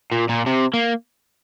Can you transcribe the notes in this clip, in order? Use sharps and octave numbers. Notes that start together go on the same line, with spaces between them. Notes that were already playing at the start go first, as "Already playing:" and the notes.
A#2
A#2
C3
A#3